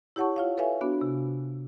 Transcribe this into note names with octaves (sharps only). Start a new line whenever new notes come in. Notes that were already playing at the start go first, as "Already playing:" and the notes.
E4 G4 C#5 F#5 A5 C#6
F4 C#5 F5
A4 B4 C#5 E5 F5 G#5
B3 D4 F#4
C3